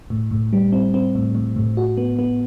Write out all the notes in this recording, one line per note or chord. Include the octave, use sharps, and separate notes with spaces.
A2
A2
G3
C4
C4
A2
A2
A2
F#4
B3
B3